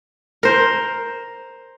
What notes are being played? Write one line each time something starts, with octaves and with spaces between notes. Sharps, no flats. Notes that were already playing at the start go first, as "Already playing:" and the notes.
A#4 C5